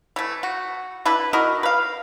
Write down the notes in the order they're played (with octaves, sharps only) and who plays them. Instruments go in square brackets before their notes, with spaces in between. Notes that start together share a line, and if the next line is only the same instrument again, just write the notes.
[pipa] E3 A3
F#4
D4 E4 B4
E4 F#4 A#4 D#5
B4 F5